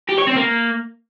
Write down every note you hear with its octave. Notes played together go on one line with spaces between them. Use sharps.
G4
C#5
C4
A#3